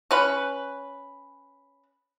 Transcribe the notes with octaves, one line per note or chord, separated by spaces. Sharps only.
C#4 B4